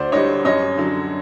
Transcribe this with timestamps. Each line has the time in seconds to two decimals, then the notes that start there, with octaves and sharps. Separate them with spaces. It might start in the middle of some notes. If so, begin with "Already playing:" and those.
Already playing: D2 C5 D5
0.12 D3 G3 C#5 D#5
0.44 F#2 C#5 D#5
0.78 D3 F#3